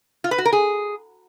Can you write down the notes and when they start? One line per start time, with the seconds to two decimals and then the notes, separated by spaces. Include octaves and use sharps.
0.24 F4
0.31 B4
0.38 F#4
0.45 A#4
0.53 G#4